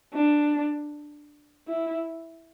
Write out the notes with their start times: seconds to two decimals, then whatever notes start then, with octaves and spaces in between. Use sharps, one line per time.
0.14 D4
1.68 E4